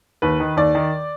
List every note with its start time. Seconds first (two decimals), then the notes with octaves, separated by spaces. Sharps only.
0.22 D#2 B4
0.40 D#3
0.57 D#2 D5
0.75 D#3